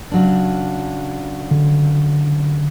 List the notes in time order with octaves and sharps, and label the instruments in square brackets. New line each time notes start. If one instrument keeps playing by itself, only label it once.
[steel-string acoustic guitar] C#3 F#3 D4
[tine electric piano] D3